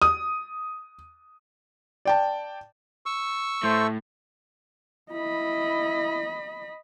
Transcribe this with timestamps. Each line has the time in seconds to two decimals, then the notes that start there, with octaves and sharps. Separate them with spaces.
0.02 D#6
2.05 D5 G5 A5
3.06 C#6 E6
3.63 A2 A3 C5
5.12 E4 D#5 B5